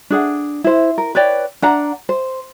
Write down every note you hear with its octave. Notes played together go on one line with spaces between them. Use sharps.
D4 G#4 F#5
E4 C5
A#4
B4 C#5 D5 G5
D4 F#5 A#5
C5